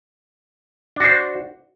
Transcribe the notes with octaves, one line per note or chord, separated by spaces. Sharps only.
D4 F#4 C5